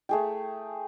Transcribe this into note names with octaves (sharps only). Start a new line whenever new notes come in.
A3 G#4 G5